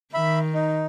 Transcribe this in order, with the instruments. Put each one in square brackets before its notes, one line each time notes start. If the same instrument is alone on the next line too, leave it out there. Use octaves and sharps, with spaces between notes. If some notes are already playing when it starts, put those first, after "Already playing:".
[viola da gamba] D#3 [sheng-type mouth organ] E5 B5
[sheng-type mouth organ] D#4